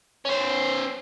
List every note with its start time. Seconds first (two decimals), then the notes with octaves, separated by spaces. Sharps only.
0.25 C#4 C5